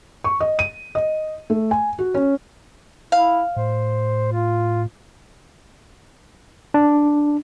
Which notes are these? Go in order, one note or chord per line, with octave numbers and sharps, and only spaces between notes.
C#6
D#5
D#7
D#5
A3
G#5
F#4
C#4
E4 F5
A2 C5
F4
D4